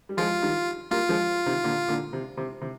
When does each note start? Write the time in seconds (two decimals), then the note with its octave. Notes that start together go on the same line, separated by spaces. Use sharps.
0.09 G3
0.17 F3 G#3 F4
0.42 D#3 G3
0.91 G3 A#3 F4
1.09 F3 G#3
1.46 C3 D#3
1.64 A#2 D3
1.88 A#2 D3
2.13 C3
2.37 C3
2.62 C3